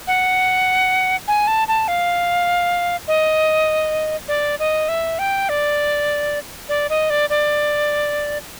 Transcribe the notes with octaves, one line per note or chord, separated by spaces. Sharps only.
F#5
G#5
A5
A5
F5
D#5
D5
D#5
E5
G5
D5
D5
D#5
D5
D5